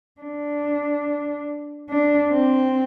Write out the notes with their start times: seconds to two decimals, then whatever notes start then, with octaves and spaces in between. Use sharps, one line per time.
0.21 D4
1.90 D4
2.32 C4